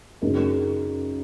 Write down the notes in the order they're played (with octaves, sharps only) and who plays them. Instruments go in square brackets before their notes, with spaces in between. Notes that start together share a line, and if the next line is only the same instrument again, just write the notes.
[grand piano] F#2 C#3 G#3 D#4 A#4